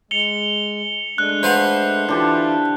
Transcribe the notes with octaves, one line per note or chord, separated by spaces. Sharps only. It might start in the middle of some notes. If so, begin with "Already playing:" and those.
G#3 C#7 F7 G7
G#3 A3 D4 F#6
B4 C5 F5 F#5
D3 E3 E4 F4 G4 A5